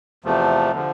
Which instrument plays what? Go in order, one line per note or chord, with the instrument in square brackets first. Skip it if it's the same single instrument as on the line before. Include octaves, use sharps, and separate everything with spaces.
[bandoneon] E2 C3 F3 A3
D3 F3